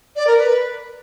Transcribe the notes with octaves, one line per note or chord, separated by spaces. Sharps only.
D5
A#4
B4